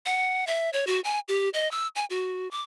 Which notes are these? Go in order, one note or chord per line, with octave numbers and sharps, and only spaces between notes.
F#5
E5
C#5
F#4
G#5
G4
D#5
E6
G#5
F#4
D6